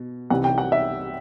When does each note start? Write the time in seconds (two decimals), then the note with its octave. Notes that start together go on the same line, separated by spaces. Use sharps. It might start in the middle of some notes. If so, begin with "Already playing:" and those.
Already playing: B2
0.30 C2 C3 E3 F#5
0.44 G5
0.58 F#5
0.72 E5